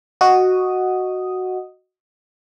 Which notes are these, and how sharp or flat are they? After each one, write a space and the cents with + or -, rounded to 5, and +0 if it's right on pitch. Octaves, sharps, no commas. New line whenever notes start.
F#4 +0 D#5 +0 D#6 +0